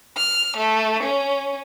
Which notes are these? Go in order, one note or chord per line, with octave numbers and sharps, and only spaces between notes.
F6
A3
C#4